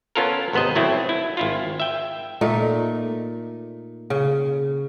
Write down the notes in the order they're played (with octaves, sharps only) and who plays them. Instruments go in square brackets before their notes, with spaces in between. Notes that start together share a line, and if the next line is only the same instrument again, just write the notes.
[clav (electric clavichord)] B3 C#4 F4 A4 A#4
G#1 C3 B3 C5 D#5
A2 F#3 A3 C4 E4
E4
G#1 E4 F4
E5 G5
[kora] A#2 A3 D#4
C#3